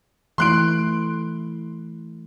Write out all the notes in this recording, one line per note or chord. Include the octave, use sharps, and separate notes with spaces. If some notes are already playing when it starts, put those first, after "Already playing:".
E3 A3 E4 C6 F#6 D7